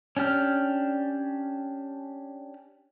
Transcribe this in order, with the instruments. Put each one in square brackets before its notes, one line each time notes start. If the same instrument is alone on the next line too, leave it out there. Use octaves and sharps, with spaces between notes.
[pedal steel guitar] C#4 D4 G4 F6